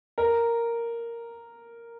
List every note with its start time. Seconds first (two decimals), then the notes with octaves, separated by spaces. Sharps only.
0.18 A#4